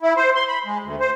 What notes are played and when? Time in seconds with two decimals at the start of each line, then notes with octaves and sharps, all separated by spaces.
0.03 E4
0.17 C5
0.35 C6
0.48 B5
0.65 G#3
0.83 D2
1.00 C5